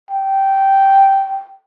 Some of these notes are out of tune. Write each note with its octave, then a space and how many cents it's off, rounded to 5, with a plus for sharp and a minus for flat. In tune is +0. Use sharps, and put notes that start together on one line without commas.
G5 -10